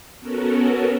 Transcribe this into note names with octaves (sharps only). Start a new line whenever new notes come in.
B3 C#4 F#4 A4 A#4